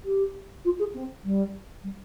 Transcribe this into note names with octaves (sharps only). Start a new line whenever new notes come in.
G4
F4
G#4
C4
G3
G3